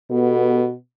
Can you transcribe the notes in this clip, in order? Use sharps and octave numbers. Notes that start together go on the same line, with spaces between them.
B2 B3 G4 A4